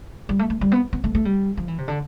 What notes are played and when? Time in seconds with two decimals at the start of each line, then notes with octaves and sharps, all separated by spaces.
0.29 G3
0.39 A3
0.50 A3
0.61 G3
0.72 B3
0.93 B3
1.04 A3
1.15 A3
1.25 G3
1.57 F3
1.68 E3
1.78 C3
1.88 D3